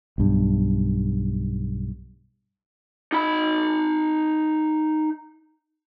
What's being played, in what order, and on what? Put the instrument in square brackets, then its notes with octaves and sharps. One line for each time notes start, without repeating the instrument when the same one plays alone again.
[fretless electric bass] B1 G2
[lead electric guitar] D#4 B5